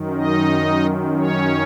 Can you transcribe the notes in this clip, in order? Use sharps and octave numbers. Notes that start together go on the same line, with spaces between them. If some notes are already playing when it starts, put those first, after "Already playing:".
Already playing: F#2 D#3
D#4 D#5
C#4 C#5